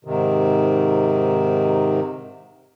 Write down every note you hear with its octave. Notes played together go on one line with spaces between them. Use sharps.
G#2 C3 D#3